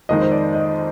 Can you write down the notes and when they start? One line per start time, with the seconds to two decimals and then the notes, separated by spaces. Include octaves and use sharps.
0.09 F2 D#3 G#3 D#4 D#5
0.21 C5
0.32 D5
0.54 D#5